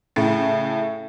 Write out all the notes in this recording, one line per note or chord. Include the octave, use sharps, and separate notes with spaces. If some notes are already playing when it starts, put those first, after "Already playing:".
A2 C#3